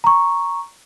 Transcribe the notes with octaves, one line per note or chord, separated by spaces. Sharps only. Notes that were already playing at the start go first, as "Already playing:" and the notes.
A#5 C#6